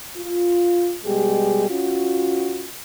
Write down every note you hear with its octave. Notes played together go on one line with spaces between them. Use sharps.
F4
B2 G3 G#3 G4 G#4
C#4 F4 F#4